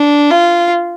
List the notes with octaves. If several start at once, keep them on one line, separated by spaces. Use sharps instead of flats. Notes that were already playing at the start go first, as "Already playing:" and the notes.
Already playing: D4
F4